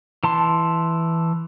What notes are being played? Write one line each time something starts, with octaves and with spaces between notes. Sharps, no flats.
E3 A5 C6